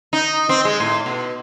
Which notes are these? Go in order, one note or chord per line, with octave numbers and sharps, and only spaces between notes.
D#4
C4
G#3
A2
B2